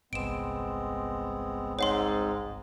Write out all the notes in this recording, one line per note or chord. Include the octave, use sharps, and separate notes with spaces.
G1 C2 G#3 B3 C4 D7 E7
G#2 C4 C#5 F#5 C6